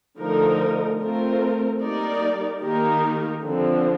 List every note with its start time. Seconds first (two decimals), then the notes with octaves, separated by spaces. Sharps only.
0.18 D3 F3 A3 D#4 A#4
0.99 A3 C4 F4 A#4
1.80 G3 A#3 D#4 A#4 D5
2.61 D#3 A#3 D#4 G4 A#4
3.42 D3 F3 C4